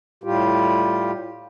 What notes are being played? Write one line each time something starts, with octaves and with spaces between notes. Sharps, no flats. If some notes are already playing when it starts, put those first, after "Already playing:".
A2 G3 F4 G4